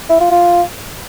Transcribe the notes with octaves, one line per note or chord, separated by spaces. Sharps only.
E4
F4
F4